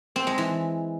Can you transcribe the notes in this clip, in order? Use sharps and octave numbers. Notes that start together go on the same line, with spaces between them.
C4
G#3
E3